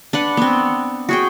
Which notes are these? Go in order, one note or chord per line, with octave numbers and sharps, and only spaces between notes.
D4 B4 F#5
B3 C4
F#4 G#4 G5